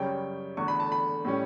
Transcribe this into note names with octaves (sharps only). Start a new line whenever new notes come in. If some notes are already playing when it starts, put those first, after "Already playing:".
Already playing: F#2 C#3 G3 C#4 G5
E2 D3 A3 C#6
B5
A5
B5
A2 G3 C#4